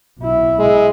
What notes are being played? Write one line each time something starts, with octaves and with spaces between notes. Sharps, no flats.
B1 E4
G#3